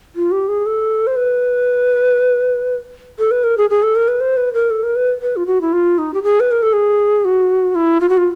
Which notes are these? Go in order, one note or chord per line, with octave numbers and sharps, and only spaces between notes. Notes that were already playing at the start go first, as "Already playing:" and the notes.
F4
G4
G#4
A4
C5
B4
A4
B4
A#4
G#4
G#4
A4
A#4
B4
C5
B4
A#4
A4
A#4
B4
B4
F4
F#4
E4
F4
D#4
G4
G#4
B4
A#4
A4
G#4
F#4
E4
F4
F#4
F4